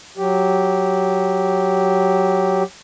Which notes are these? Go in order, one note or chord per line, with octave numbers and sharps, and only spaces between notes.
F#3 G4